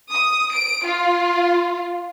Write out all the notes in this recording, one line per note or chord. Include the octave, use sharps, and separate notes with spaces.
D#6
D7
F4